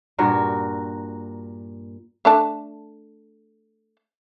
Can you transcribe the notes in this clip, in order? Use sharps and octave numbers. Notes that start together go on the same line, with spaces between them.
G2 A#2 F#4 A#4
A3 D4 A5